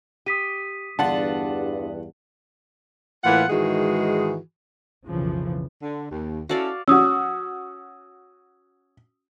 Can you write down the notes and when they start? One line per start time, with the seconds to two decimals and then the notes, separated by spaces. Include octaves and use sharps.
0.26 G4 D#6 B6 D#7
0.99 E2 G2 D3 D4 F4 F#5 A5
3.24 A2 E3 A#3 F4 F#5
3.49 G#2 D#3 E3 G#3 F#4 G#4
5.07 B1 F2 C#3 E3 F3
5.82 D3
6.11 D#2
6.49 C#4 E4 F#4 A4 D5 F5
6.88 C#4 F#4 D#6 E6